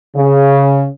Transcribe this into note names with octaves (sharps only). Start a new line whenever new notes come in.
C#3